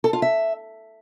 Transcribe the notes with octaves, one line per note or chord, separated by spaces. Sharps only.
A4
F4
E5